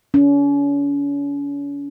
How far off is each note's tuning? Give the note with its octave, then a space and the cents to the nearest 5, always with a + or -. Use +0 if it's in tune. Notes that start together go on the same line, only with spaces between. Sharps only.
C#4 +40